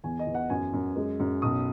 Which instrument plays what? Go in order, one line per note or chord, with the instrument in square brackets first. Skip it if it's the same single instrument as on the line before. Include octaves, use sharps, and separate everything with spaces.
[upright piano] E2 G#5
D#5
E2
F#5
F#2 G#5
F#2
G#3
F#2
B1 D#6